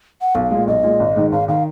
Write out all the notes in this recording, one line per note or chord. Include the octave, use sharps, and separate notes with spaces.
F#5
B1 F5
A#2 G#3
B1 D#5
A#2 G#3
G#1
G#2 D#3
G#1 F5
D#3 F5